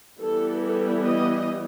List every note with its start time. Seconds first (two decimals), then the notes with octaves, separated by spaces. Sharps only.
0.21 E3 G3 B3 A4
0.64 A4
1.07 D#5